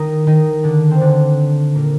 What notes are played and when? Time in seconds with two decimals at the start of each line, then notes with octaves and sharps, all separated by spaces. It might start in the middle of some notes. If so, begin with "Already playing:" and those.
Already playing: D#3 D#4
0.27 D#3 D#4
0.64 D3 D4
0.91 C4
1.00 D3 D4
1.75 A#2 A#3